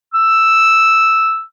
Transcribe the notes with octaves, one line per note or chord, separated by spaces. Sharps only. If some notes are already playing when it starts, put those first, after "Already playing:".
E6